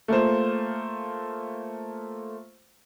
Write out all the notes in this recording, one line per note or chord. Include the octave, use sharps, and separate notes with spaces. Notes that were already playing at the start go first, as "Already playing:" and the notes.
A3 A#3 F4 C5